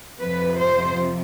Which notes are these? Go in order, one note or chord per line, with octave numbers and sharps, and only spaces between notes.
F2 C3 F3 B4
C5